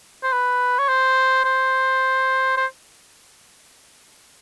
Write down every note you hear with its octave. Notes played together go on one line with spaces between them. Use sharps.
C5
B4
C#5
C5
C5
C5